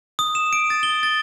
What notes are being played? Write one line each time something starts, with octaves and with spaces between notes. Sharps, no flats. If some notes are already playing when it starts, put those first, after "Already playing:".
D#6
E7
D7
A6
G7
A6